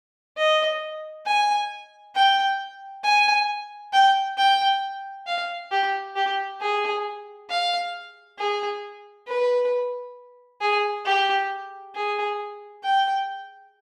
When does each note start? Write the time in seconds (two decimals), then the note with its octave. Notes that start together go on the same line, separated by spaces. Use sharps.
0.37 D#5
1.26 G#5
2.15 G5
3.04 G#5
3.93 G5
4.38 G5
5.27 F5
5.71 G4
6.16 G4
6.61 G#4
7.50 F5
8.39 G#4
9.27 B4
10.61 G#4
11.05 G4
11.95 G#4
12.83 G5